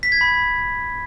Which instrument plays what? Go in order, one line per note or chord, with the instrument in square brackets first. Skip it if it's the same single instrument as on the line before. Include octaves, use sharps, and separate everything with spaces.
[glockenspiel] B6
G#6
B5